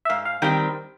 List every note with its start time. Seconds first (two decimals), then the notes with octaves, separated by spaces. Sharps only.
0.05 E5
0.09 G#2 F5
0.25 F5
0.42 D#3 G3 C4 G5